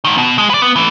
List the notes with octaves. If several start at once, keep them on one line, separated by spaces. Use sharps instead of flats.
G#2 D#3
B2
G#3
B4 D5
B3
E3 A3